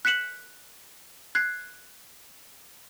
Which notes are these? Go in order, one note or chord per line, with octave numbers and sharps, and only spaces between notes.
F#6 B6 C#7 E7 F#7
F#6 G#6 C7